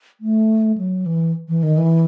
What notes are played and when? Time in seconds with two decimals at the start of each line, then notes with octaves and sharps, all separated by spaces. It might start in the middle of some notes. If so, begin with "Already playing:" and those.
0.21 A3
0.78 F#3
1.06 E3
1.49 E3
1.63 D#3
1.77 E3